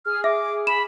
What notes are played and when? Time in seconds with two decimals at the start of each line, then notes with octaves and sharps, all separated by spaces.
0.06 G#4 F6
0.24 E5 D6
0.67 B5 E7